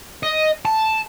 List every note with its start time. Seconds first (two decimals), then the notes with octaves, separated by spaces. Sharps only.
0.23 D#5
0.65 A5